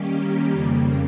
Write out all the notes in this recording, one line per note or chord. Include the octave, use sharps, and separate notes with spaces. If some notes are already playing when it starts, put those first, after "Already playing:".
Already playing: D#3 G3 A#3 C#4 G4
F2 C#3 G3 A#3